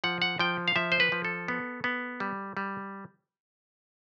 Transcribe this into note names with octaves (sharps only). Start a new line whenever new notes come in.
F3 F#5
F#5
F3 G5
F5
F3 E5
C5
B4
F3
A4
B3
B3
G3
G3